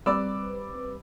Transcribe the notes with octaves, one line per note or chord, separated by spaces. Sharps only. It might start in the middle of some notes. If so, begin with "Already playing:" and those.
G3 C4 B4 D5 D6 E6